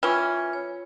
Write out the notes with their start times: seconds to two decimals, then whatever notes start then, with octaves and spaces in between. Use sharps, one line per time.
0.03 E3 C#4 F4
0.53 C#5